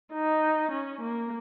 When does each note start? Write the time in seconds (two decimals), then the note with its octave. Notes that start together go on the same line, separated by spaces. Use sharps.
0.13 D#4
0.71 C#4
1.01 A#3